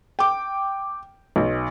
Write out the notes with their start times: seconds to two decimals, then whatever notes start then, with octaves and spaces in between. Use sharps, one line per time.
0.19 G5 D6
1.36 B1